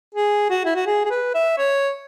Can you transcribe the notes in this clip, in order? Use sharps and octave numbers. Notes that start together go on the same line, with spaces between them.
G#4
F#4
E4
F#4
G#4
G#4
B4
E5
C#5